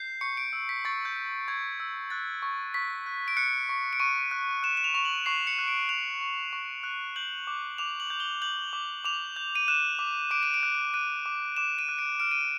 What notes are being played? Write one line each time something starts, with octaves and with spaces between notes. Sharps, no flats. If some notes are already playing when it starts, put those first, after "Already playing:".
Already playing: G6 C7
C#6 C#7
D7
E6
B6
C#6 A6
G6
G6
C#6 G#6
E6
F#6 A6
C#6
C#6 B6
F#6
D7
F#6 C#7
C#6
D7
C#6 D#7
F#6
F#6 E7
E7
F7
C#6 F7
F#7
C#6 C7
C#7
F#6
D7
F#6 F7
C#6
C#6
F#6
G6 F#7
D6
D6 F7
F#7
G6
G7
G6 F#7
D6
D6 F7
G6
D#7
F#6 E7
D6
D6 D7
D#7
D7
F#6
F#6 D#7
D6
D6 E7
D#7
F#6
D7
F6 D7
D#7
D7